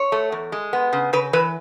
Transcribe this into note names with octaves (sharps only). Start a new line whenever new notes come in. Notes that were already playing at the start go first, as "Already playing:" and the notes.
Already playing: C#5
A3
E2
G#3
B3
C#3
C#3 B4
E3 B4